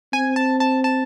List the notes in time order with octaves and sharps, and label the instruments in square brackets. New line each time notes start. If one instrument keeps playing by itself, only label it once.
[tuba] C4 [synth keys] G#5
[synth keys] A5
A5
A5